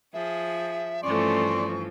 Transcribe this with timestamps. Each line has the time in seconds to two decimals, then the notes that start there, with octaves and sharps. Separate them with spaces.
0.14 F3 G#4 E5
1.04 G2 E3 F3 A3 C#4 D5 C6 C#6